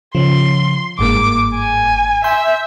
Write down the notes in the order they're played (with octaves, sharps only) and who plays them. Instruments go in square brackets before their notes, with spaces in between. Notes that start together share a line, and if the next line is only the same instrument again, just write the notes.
[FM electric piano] C#3 F3 [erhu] C6
[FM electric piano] G1 G#2 A#3 [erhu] D6
[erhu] G#5
[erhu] E5 [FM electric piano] G#5 C6 G6